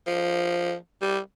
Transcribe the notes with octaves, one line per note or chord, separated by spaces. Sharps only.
F3
G3